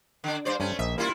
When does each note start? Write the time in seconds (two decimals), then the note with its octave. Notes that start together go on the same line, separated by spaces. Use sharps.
0.24 D3 D4
0.45 G2 C5 D5
0.60 G2 A3 C#4
0.79 A#1 D#5 E5
0.98 G3 A#3 E4 F4